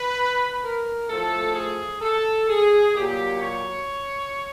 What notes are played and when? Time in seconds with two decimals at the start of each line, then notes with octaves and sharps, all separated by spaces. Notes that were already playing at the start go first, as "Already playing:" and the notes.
Already playing: B4
0.63 A#4
1.09 A2 F3 A3 A4
1.55 G#4
2.02 A4
2.48 G#4
2.95 A#2 F#3 A#3 G4
3.42 C#5